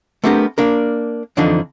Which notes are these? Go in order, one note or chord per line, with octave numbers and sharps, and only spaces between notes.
A3 B3 C4 D4 G4 A#4
A#3 D4 A#4
F2 D3 E3 F3 D4 D#4